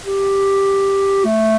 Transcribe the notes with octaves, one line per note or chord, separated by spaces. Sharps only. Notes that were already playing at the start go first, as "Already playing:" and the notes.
G4
A3